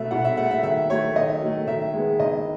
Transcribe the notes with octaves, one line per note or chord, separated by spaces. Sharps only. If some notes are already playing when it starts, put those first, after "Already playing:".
Already playing: B2 A3 E5
B2 F#5
E5
A3 F#5
E5
D#3 E5
F#3 A3 C#5
D#3 D#5
F#3 A3
D#3 E5
G#3 B3
D#3 D#5